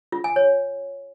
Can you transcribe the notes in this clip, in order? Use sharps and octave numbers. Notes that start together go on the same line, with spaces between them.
F4
G#5
C#5